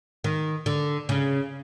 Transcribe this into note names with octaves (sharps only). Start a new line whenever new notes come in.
D#3
D3
C#3